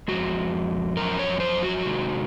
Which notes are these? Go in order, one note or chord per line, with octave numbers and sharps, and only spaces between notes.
F2 C#3 G#3 F#4
F#2 F3 A#4
C#5
C5
F#4
C3 D#3 G#3